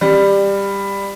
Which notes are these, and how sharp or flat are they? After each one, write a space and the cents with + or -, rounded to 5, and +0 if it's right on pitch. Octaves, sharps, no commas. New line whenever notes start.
G3 +15